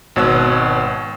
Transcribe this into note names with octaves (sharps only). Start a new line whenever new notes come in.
G#1 B2 C#5 E6 F#6